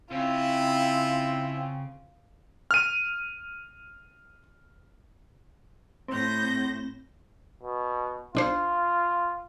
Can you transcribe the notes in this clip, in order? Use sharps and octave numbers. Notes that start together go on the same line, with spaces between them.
C#3 C4 E4 F4
F6 D#7
A2 C4 G6 A#6
B2
B1 D4 F4 C5